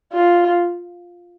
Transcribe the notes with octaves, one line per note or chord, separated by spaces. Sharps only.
F4